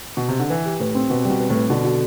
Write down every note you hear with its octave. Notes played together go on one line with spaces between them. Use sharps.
B2
C3
D3
E3 B4
G4
A2 B4
C4
B2 B4
B2 G3
B4
A2
B4
B2 D3
F#4